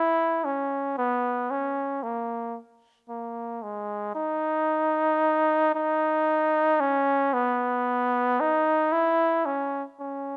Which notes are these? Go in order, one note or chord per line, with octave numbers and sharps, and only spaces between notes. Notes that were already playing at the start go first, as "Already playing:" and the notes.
Already playing: E4
C#4
B3
C#4
A#3
A#3
G#3
D#4
D#4
C#4
B3
D#4
E4
C#4
C#4